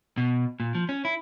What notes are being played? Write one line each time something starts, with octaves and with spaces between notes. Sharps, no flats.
B2
A#2
F3
C#4
E4